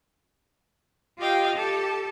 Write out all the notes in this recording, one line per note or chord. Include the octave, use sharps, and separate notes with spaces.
F4 G4 D#5 F5 G5
G4 A4 A5